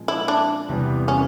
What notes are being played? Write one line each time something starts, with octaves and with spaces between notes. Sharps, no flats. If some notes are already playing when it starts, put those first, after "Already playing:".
Already playing: A#2 F3 G#3 C4
E4
D4
E2 C3 E3 G3 B3
C#4